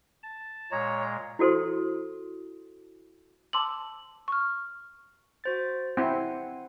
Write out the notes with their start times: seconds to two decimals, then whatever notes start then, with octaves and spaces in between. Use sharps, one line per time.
0.23 A5
0.72 A#2 G#3 C#5 A#5
1.39 E4 F#4 A4 C5 C6
3.53 A5 C6 D6 E6 F#7
4.28 C#6 F6
5.44 F#4 C5 A6
5.97 C4 E4 F#5 G#5 C6